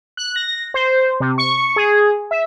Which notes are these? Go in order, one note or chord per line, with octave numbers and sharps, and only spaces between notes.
F#6
A#6
C5
C3
C#6
G#4
E5